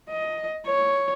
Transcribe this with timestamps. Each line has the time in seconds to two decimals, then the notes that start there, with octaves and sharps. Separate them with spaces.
0.10 D#5
0.66 C#5